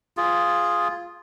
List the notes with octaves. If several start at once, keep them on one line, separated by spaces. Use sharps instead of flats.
F4 G#4